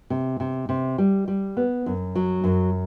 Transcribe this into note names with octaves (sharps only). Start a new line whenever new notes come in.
C3
C3
C3
G3
G3
B3
F#2
F#3
F#2